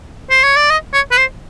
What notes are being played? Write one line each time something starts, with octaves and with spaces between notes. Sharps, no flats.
C5
C#5
D5
D#5
C#5
B4
C5